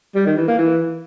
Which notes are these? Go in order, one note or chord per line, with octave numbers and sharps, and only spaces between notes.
G3
D#3
E3
A#3
E3